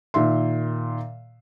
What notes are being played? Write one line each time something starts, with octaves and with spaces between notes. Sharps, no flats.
A#2 D#3 E5 C6